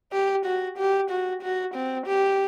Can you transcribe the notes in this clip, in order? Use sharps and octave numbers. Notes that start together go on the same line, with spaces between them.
G4
F#4
G4
F#4
F#4
C4
G4